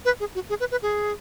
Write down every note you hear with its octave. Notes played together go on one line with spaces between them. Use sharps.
B4
G#4
F#4
G#4
B4
B4
G#4